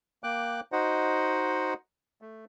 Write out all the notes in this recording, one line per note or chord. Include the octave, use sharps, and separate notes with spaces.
A#3 G5 D6 F#6
D#4 F#4 C5 D#5 F#5
A3